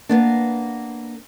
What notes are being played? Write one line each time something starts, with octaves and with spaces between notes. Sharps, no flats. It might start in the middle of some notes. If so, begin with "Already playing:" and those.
A#3 B3 D4